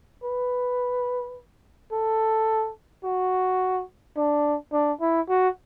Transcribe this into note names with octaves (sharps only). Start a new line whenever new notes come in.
B4
A4
F#4
D4
D4
E4
F#4